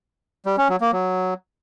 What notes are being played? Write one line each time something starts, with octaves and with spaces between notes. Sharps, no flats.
G3
C#4
F#3
A#3
F#3